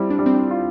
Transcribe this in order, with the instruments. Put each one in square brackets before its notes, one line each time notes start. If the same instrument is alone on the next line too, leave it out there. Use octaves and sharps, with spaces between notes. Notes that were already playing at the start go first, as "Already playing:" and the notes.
Already playing: [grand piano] G3 C4 [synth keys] E4 F4
[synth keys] D4
[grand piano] G3
[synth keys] C4
D4
[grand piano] F4